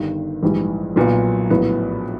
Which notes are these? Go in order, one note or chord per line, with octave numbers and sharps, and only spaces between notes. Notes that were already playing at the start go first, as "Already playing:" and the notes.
Already playing: G1 G2 D#3
A#1 G#2 E3 G3
B1 A#2 F#3 B3
A#1 A2 F#3 B3